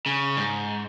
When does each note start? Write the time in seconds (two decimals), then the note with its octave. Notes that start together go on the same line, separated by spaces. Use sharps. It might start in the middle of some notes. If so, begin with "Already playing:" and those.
0.06 C#3
0.37 G#2